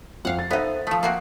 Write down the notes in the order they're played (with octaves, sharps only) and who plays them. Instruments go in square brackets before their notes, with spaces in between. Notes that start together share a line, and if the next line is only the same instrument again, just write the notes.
[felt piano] F2 [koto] F5 F#5
[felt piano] A6
[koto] B3 D#4 [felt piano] A4 C5 E5
[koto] F3 A3 [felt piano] D#6
[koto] A#3 C4 F#4